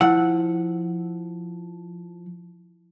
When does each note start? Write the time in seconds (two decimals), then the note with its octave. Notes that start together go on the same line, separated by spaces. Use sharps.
0.01 F3 E4 F#5